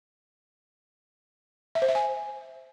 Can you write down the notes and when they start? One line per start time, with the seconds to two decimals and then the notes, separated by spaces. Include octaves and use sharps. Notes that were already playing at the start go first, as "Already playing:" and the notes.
1.75 E5
1.82 C5
1.88 E5
1.95 G#5